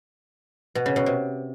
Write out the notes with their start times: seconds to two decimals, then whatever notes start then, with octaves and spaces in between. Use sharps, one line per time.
0.75 B2
0.86 C#3
0.96 B2
1.06 C3